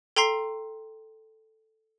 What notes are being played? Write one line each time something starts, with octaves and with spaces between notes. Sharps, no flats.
A4 G5 A#5 C6 C7